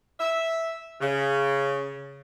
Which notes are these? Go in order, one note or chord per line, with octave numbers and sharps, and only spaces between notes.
E5
C#3